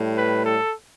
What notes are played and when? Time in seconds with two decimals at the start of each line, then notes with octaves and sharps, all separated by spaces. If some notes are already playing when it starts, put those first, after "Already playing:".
Already playing: A2 G3
0.17 B4
0.46 A4